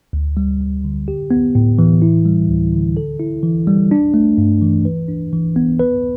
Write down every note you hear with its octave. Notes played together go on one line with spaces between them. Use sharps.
D2
G3
D2
D3
G4
B3
A2
E3
E4
G3
D2
D3
A4
E4
E3
G3
D4
A3
G2
E3
B4
D4
E3
B3
B4